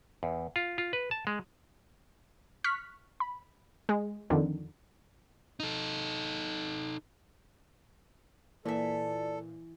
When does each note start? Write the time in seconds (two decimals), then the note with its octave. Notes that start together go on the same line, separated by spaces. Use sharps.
0.23 E2
0.56 F4
0.78 F4
0.93 B4
1.11 A5
1.27 G#3
2.64 C#6 F6 F#6 B6
3.20 B5
3.89 G#3
4.30 F2 D3 D#3
5.60 D#4 A4
8.65 A#2 E3 A4 D5 E5